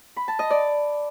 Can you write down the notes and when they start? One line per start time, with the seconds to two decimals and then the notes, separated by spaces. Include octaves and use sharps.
0.16 B5
0.28 A5
0.39 D#5
0.50 D5